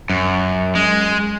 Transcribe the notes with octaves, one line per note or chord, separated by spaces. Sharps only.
F#2
G#3